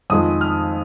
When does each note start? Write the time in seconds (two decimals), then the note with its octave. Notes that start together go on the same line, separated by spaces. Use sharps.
0.10 F2 D#3 G#3 D#6
0.41 F6